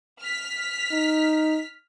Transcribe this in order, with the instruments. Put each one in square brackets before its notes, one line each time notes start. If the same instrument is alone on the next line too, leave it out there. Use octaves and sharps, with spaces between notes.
[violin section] F6 B6
[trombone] D#4